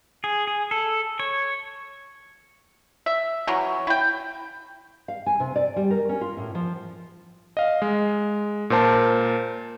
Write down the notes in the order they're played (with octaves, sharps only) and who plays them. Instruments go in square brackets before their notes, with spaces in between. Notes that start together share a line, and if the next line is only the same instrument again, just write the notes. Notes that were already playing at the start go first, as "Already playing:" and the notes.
[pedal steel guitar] G#4
G#4
A4
C#5
[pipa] E5
E3 F#3 C#4
E4 G5
[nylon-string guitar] F5
G#5
C3
D5
G3
A#4
C#4
F4
A2
F3
[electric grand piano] D#5 F5
G#3
A#2 A#4 C5 A5